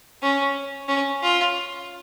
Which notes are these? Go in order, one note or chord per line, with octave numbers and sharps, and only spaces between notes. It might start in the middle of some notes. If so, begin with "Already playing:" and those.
C#4
C#4
F4